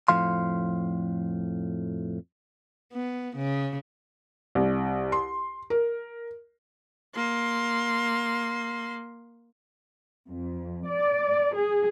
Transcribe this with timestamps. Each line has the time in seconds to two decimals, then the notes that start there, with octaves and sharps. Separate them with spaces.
0.08 F2 A2 F3 F5 C6
2.93 B3
3.36 C#3
4.55 C2
5.12 C6
5.70 A#4
7.15 A#3 C6
10.29 F2
10.86 D5
11.55 G#4